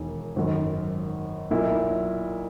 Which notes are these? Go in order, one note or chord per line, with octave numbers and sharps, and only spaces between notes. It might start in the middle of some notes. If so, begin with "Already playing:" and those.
Already playing: E1 D#3
G#1 F#2 D#3
B1 A#2 A#3 E4